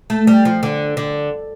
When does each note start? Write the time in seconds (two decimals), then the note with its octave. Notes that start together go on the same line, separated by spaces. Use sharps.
0.10 A3
0.27 G3
0.45 F3
0.63 D3
0.97 D3